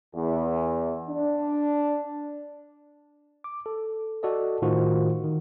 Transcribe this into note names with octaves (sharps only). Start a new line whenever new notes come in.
E2
D4
D6
A4
F#4 A4 D5 D#5
A2 D#3 F4 F#4 C5
D#3